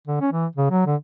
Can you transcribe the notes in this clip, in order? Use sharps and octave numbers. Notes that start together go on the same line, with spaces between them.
D3
C#4
E3
C#3
F#3
D3